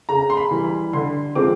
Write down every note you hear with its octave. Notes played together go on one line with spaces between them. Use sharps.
C#3 A#5
C6
B5
E3 G3
B5
D3 C6
F3 G#3 C4 D6